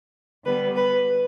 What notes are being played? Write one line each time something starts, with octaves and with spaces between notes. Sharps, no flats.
D3 G3 B3 B4
B4